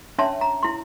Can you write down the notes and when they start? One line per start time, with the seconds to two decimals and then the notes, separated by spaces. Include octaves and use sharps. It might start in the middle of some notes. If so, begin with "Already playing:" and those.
0.18 C#4 D4 C#5 E5 A5 C6
0.41 A#5
0.63 E4 C6